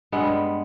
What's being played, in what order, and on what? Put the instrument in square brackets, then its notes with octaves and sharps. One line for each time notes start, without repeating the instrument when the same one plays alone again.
[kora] G2 G3 G#3 B3